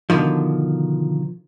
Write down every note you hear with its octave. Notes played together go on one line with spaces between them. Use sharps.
B2 D3 D#3 F3